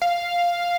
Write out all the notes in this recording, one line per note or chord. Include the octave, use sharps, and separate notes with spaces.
F5